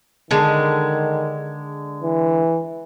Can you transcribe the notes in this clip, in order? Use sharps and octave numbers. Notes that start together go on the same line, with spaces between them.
D3 D#3 G#3
E3